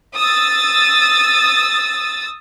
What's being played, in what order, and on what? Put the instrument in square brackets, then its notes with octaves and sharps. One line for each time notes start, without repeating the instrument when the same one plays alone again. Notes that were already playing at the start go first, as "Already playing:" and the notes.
[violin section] D#6 E6 A6